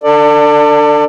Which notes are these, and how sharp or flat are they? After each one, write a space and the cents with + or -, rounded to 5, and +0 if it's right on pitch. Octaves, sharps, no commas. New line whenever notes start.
D4 +0 A4 +35 D5 +15